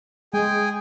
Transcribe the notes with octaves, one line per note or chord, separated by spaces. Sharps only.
G#3 G#4 G5 G#5